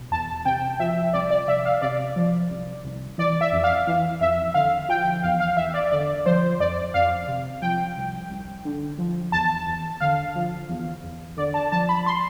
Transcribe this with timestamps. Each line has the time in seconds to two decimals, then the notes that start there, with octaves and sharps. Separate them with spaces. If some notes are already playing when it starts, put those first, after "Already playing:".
Already playing: B2
0.11 E2 A5
0.45 C3 G5
0.80 F3 E5
1.13 C2 D5
1.30 D5
1.48 C2 E5
1.65 F5
1.82 C3 D5
2.16 F3
2.50 C2
2.84 C2
3.18 E3 D5
3.41 E5
3.52 F2
3.64 F5
3.86 E3 F5
4.21 F2 E5
4.54 D3 F5
4.89 F3 G5
5.23 E2 F5
5.40 F5
5.57 E2 E5
5.74 D5
5.91 D3 D5
6.26 F3 C5
6.60 F2 D5
6.94 F2 F5
7.28 C3
7.62 F3 G5
7.97 C2
8.30 C2
8.65 D3
8.98 F3
9.32 E2 A5
9.66 E2
10.00 D3 F5
10.36 F3
10.69 E2
11.03 E2
11.37 D3 D5
11.54 A5
11.72 F3 A5
11.89 B5
12.06 C6